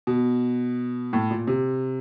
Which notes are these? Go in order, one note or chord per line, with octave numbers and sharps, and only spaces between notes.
B2
A2
A#2
C3